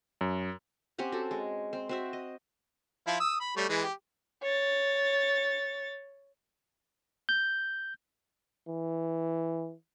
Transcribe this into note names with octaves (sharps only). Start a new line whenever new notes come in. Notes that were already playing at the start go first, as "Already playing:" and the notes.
F#2
C4 C#4 G4 F#5
F#4 A4
G#3
C4
C4 F#4 E5
D#5
F3 E4 F4
D#6 E6
B5
G3 A3 C#5
E3 G#3
G4
C#5 A6
G6
E3